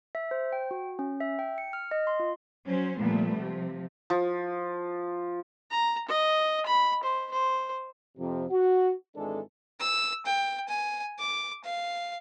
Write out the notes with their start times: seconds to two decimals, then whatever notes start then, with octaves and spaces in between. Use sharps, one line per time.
0.15 E5
0.31 C5
0.53 G5
0.71 F#4
0.99 C#4
1.20 E5
1.39 G5
1.58 C#7
1.73 F6
1.91 D#5
2.07 C6
2.20 F4
2.65 F#3 C#4 C5
2.98 A#2 F3 G3 A3 B3
3.37 C3 F3
4.10 F3
5.71 A#5
6.08 D#5
6.66 B5
7.03 C5
7.31 C5
8.18 F2 C3
8.51 F#4
9.16 G#1 E3 G#3 D4 A4
9.80 E6
10.26 G5
10.68 G#5
11.19 D6
11.64 F5